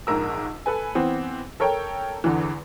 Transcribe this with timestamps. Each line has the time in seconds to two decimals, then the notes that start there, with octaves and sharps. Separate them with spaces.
0.07 A#1 G#2 A#4 E6
0.66 A4 B4 G#5
0.95 E3 B3 C4
1.60 A4 A#4 C#5 G5
2.24 E2 D3 E3